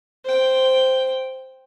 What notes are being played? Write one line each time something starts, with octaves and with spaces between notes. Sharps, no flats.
C5 G5